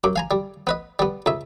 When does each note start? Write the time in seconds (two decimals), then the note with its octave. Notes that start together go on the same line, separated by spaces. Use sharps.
0.04 F#2 D6
0.16 F5 G#5 A#5
0.31 G3
0.67 B3 B4 D#5
0.99 G3 B3
1.26 C#2 E5